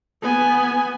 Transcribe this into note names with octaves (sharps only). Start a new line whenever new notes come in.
B3 G#5